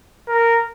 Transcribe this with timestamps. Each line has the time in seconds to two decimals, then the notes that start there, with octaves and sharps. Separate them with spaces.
0.28 A#4